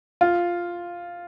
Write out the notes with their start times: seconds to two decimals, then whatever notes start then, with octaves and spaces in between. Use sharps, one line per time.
0.21 F4